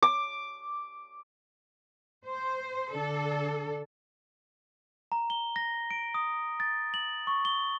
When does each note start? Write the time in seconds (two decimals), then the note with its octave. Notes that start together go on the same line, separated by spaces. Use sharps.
0.02 D6
2.24 C5
2.93 D3 D4 A4
5.12 A#5
5.30 G7
5.56 A#6
5.91 D7
6.14 D#6
6.60 A6
6.94 F#7
7.27 C#6
7.45 G7